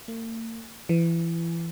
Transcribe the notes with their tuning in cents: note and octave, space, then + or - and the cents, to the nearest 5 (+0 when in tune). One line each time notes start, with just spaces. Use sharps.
A#3 -45
E3 +25